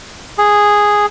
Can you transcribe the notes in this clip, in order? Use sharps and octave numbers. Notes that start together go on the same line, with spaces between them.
G#4